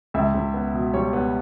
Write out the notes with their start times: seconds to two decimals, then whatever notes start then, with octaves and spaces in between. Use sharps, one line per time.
0.14 C#2 E5
0.34 C#2
0.54 B3
0.74 B2
0.94 G3 C#5
1.13 B3